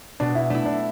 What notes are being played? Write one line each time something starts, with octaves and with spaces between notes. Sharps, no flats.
B2 D4
E4
A3 D4 E4
D4